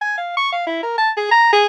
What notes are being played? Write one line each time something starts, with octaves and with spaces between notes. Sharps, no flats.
G#5
F5
C#6
F5
E4
A#4
A5
G#4
A#5
G#4